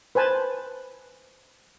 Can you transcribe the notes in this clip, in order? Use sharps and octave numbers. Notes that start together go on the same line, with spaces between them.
B4 C5 G#5 A5